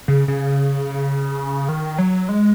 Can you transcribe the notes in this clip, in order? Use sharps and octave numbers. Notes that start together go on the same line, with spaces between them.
C#3
C#3
D#3
F#3
G#3